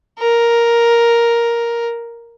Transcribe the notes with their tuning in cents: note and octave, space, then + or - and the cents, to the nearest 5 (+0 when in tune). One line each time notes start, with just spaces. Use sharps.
A#4 +5